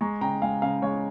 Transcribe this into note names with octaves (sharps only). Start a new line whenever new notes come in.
G#3 A#5 C#6
C#3 G5 A#5
G#3 F5 G#5
C#3 F5 G#5
G#3 C#5 F5